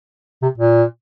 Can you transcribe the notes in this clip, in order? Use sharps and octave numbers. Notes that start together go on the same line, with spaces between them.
C3
A#2